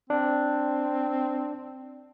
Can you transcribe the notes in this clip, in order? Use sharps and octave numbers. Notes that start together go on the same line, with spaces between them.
C4 D4